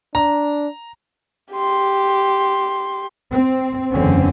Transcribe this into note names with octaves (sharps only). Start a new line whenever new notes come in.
D4 A#5
G4 C6
C4
F#1 E2 D3 C4 C#4